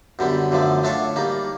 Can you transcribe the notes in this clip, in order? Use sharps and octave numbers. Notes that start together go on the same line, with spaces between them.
F#2 D3 G3 B3
F#2 D3 F3 A3
A3 D4 F4 A4 C#5
G3 A#3 D#4